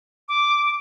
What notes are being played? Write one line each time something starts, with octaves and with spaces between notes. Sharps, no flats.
D6